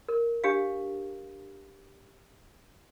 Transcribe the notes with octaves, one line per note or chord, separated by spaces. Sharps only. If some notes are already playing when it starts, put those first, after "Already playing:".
A#4
D4 G4 F5